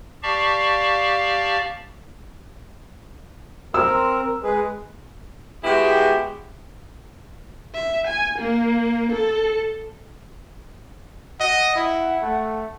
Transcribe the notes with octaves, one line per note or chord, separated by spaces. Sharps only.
G4 D5 F5 A5 C#6
C4 A#4 E6
G#3 G#4 B4
G#3 B3 E4 F#4 G4
E5
G#5
A#3
A4
D#5 F#5
E4
A3